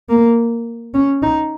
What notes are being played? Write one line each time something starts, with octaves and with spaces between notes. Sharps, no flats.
A#3
C#4
D#4